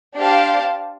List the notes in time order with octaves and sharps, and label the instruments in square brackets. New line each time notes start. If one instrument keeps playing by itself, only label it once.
[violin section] D4 G4 C5 F5 A5